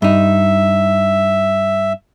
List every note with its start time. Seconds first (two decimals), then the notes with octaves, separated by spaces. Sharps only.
0.02 G2 D#4 E5